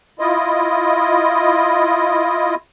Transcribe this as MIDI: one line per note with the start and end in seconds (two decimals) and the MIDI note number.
0.19 2.55 64
0.19 2.55 65
0.19 2.55 75